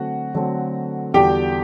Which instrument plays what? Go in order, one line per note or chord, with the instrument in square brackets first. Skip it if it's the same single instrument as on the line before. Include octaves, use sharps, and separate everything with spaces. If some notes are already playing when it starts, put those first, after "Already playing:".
Already playing: [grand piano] D3 F#3 A3 C4 [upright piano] F#4 F#5
[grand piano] D3 F#3 A3 C4
[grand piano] E2 D3 G3 D4 F#4 [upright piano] G4 G5